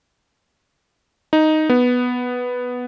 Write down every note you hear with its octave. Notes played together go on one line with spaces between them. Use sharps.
D#4
B3